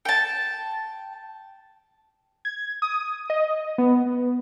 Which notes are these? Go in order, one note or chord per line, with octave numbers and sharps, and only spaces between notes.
G5 A5
G#6
D#6
D#5
B3